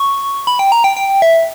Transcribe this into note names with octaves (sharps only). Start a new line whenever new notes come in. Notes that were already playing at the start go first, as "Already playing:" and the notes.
Already playing: C#6
B5
G5
A#5
G5
G5
E5